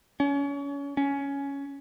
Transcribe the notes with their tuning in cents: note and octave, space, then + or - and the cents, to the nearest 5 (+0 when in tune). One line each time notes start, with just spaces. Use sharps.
C#4 +30
C#4 +10